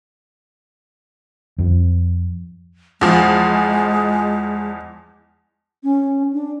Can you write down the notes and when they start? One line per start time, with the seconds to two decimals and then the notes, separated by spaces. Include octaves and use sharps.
1.58 F2 F3
3.01 E2 F3 G#3
5.84 C#4
6.33 D4